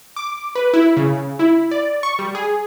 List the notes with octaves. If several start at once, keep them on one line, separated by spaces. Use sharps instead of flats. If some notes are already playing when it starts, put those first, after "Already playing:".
D6
B4
E4
C#3
E4
D5
C#6
G3
G#4